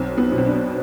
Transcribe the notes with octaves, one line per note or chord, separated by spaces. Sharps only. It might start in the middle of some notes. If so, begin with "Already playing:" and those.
Already playing: B1 C4
B3
B2
C4
D4